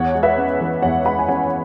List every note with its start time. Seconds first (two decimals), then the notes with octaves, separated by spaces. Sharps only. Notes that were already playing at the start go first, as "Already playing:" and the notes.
Already playing: E2 C#5 F#5
0.15 G#3
0.23 B4 E5
0.38 C#4
0.61 E3
0.82 E2 C#5 F#5
1.05 G#3 F#5 B5
1.19 G#5
1.28 C#4 C#5 F#5